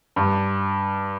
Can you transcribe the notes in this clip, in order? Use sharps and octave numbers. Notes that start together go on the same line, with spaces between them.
G2